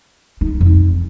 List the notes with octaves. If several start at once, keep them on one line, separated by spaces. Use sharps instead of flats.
D#4
F2